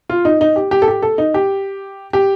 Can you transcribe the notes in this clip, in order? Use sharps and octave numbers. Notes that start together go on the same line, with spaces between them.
F4
D#4
D#4
G4
G4
A4
G4
A4
D#4
G4
G4